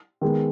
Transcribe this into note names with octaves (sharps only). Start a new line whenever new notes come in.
D#3 G#3 B3